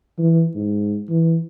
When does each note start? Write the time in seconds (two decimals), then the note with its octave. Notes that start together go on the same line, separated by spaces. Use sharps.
0.18 E3
0.55 G#2
1.09 E3